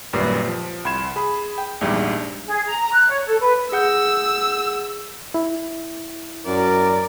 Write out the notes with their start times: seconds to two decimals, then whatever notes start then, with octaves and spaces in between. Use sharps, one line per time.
0.13 G#1 F#2 A#2 G3 B4 C7
0.48 F3
0.85 C2 B5 C6 G#6 E7
1.16 G#4 B5
1.58 G5
1.81 A#1 E2 G#2 G3 D4
2.46 G#4
2.67 A#5
2.80 A#5
2.92 F#6
3.09 C#5
3.26 A4
3.40 B4
3.72 G#4 F#5 E6 G6
5.34 E4
6.47 F#2 A#4 D5